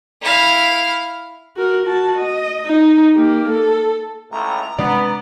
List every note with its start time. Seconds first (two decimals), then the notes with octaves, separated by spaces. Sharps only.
0.22 E4 F5
1.56 F#4 A#4
1.85 F#4 A5
2.18 D#5
2.67 D#4
3.16 A#3 G4
3.49 A4
4.32 C#2 A2 A#5
4.79 C3 G#3 B3 D4 D5